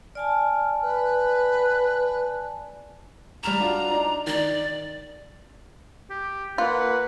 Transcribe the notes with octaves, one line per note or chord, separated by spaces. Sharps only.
D5 G#5 A5 F6
B4
G3 A#5 F6 E7
D4 F4 F#4
D4 D#4
D#3 D5
G4
A#3 F4 B4 F#5